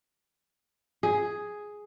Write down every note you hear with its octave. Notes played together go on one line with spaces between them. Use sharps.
G#4